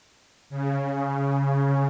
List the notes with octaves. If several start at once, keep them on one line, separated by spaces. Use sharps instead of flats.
C#3